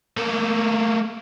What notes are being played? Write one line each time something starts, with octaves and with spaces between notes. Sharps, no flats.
A3 A#3